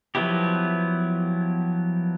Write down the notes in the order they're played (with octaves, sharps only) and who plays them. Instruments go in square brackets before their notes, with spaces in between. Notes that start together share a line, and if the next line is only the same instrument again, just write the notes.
[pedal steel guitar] F3 F#3 B3 E4 G4